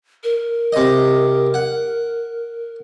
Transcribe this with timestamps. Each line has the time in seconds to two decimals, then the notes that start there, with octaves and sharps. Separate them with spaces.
0.24 A#4
0.73 C3 D#5
1.54 F#5